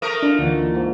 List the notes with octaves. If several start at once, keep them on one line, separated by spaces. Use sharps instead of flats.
A3 A#4 D#6
D4 D#4 F4 D6
D2 D3 E3 A#3
G#2 A#3